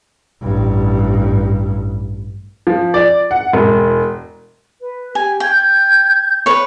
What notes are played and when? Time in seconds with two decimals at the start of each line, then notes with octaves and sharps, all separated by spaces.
0.42 A1 G2
2.67 F3
2.94 D5
3.31 F#5
3.53 E1
4.80 B4
5.15 G4 G#5
5.40 G5 G6 G#6
6.46 B4 C#5